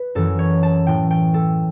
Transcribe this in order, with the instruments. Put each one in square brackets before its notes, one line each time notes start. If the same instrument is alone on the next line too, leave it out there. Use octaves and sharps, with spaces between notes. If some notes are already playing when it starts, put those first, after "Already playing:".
Already playing: [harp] B4
F#2 E3 A4
C#5
A5
A2 E3 G5
G5
A4